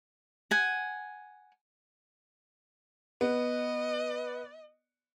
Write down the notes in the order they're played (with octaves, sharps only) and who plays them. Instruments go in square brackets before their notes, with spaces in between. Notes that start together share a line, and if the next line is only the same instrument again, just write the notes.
[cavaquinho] F#5 G#5
[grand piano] B3 [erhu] D#5